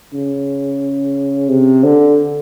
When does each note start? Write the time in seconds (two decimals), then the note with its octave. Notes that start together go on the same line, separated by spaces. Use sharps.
0.14 C#3
1.49 C3
1.84 D3